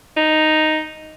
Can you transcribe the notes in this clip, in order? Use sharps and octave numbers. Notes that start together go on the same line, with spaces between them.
D#4